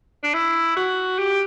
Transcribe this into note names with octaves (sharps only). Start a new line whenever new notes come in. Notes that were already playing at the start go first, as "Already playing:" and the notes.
D4
E4
F#4
G4